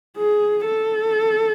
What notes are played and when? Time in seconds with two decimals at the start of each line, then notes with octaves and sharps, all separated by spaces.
0.17 G#4
0.65 A4